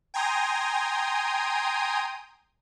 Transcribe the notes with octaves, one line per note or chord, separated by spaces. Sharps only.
G5 G#5 A#5 C6 D#6